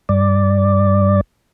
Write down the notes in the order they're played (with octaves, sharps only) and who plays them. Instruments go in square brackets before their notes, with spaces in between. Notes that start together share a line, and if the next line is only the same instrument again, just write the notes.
[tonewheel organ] G2 D5